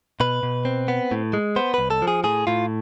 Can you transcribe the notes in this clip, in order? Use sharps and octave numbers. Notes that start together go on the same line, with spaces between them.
B2 B4
B2
C4
B3
A2
G#3
B3 C5
C2 B4
A4
F3
G#4
A2 G#4
A2 F4